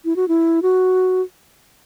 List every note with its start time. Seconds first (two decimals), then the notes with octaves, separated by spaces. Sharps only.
0.05 E4
0.16 F#4
0.28 E4
0.62 F#4